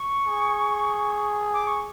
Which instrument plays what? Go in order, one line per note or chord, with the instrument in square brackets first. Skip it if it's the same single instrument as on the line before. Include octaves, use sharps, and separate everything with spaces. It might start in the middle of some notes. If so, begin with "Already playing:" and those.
Already playing: [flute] C#6
[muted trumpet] G#4
[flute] D6
C#6